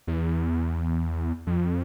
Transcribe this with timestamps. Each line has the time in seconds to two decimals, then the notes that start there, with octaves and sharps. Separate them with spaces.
0.07 E2
1.47 F2